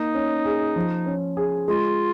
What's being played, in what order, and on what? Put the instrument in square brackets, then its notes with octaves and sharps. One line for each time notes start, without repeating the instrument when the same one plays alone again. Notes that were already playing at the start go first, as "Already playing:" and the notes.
Already playing: [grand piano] A#3 [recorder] D#4
[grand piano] C#4
G#4
F3
C#4
G#4
[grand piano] G#3 [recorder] F4